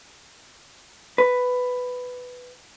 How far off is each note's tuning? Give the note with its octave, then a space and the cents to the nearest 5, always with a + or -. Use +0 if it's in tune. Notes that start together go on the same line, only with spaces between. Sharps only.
B4 +10